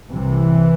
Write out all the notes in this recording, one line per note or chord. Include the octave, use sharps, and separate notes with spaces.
C2 C3 E3